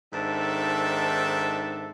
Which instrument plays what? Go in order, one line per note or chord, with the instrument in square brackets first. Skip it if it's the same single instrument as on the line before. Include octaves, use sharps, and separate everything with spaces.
[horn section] G#2 D#3 C4 D4 A4 E5